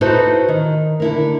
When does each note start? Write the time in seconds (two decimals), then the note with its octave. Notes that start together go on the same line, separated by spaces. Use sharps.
0.01 D#4 E4 F#4 A4 B4 C5
0.48 D#3
1.00 D3 E4 A#4